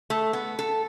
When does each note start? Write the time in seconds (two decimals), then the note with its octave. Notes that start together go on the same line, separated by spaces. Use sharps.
0.10 A3
0.33 B3
0.59 A4